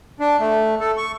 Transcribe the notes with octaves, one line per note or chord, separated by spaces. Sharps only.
D4
A3
A4
C#6